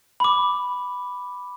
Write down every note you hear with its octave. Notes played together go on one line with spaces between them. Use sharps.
B5 D6